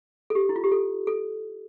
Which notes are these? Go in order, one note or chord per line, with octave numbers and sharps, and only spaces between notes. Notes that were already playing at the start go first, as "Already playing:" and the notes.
A4
G4
E4
F4
G4
A4
A4